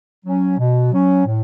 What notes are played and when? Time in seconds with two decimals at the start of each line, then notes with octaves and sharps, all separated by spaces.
0.25 F#3 C#4
0.58 B2
0.92 F#3 C#4
1.26 A2